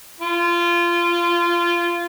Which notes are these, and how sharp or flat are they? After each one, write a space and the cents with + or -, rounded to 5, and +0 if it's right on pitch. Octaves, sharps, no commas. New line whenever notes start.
F4 -20